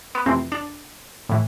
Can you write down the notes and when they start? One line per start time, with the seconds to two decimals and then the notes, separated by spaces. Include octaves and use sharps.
0.15 B3
0.26 F2 C3 E3 A3 C4
0.52 D4
1.29 A2 E3